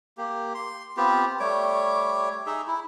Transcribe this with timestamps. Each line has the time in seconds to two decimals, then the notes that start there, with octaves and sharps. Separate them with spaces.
0.18 A#3 G4
0.55 C6
0.97 B3 C4 F4 G4
1.40 G3 A3 C#5 D6
2.46 D#4 G#4 E5
2.67 E4